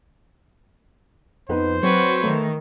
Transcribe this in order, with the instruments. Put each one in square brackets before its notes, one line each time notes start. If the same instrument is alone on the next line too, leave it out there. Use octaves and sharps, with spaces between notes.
[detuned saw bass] F2 [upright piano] B3 D#4 B4 [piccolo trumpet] C5
[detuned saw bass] F#3 [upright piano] C4 [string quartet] F#4 B4 C#5
[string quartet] D#3 [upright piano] A3